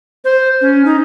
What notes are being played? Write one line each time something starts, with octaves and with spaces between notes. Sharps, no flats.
C5
C#4
D#4